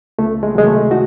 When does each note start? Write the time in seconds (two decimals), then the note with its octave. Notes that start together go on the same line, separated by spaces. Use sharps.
0.19 C#2 A3
0.43 G#3
0.55 C3 D#3 F#3 G#3
0.67 A3
0.91 D#4 F#4